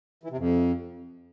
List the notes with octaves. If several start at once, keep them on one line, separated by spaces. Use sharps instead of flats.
E3
C3
F2